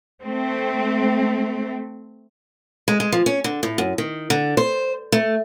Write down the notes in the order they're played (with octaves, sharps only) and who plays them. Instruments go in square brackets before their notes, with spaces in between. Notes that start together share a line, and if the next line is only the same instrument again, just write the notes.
[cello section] A3 C4
[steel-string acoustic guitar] G#3
G#3
F3
C#4
D3
A2
F#2
D#3
D3
C5
A3